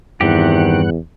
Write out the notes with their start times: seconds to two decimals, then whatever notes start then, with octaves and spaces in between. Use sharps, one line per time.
0.21 E2 G2 D#3 E3 C4 G4 F#5